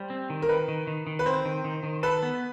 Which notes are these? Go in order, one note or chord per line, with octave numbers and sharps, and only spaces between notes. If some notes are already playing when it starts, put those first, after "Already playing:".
Already playing: G3 C5
C4
D#3
A#4
D#3 B4
D#3
D#3
D#3
B4
C4 C5
D#3
D#3
D#3
A4 B4
B3